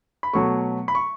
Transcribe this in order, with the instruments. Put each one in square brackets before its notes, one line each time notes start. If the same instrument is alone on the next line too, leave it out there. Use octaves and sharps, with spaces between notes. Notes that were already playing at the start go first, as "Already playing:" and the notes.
[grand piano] B5
B2 F#3 A3 C#6
B5
C#6